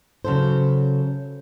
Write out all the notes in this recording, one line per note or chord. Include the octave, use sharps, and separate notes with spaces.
C#3 F3 F#3 A4 C5